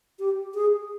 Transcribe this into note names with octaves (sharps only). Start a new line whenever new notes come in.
G4
G#4